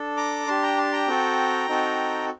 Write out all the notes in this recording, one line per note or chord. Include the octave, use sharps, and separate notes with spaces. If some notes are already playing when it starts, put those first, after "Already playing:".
Already playing: D4 A4
A#5 D6
D4 G4 A5 C6
G5 A#5
A5 C6
G5 A#5
C4 F#4 A4
C4 D#4 F#4 A4